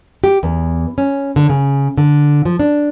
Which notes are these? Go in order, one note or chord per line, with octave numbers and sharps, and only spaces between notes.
G4
E2
C#4
D3
C#3
D3
F3
D4